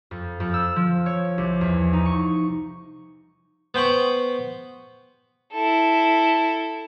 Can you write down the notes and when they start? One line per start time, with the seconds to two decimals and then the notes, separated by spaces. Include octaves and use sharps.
0.11 F2
0.40 F2
0.54 E6
0.76 F3
1.06 C#5
1.38 C2
1.61 E2
1.93 D#4
2.06 C#6
3.74 B3 C5 G5 B5 C#6
5.52 E4 A4